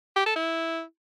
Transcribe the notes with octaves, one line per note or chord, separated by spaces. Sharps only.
G4
A4
E4